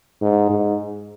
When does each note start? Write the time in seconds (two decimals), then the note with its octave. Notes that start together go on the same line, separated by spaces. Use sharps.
0.21 G#2
0.50 G#2